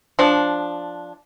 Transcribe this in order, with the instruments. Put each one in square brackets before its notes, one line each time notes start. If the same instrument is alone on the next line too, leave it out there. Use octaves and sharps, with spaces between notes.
[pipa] F3 D4